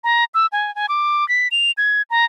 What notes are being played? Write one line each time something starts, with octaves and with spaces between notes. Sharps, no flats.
A#5
E6
G#5
G#5
D6
B6
F7
G#6
A#5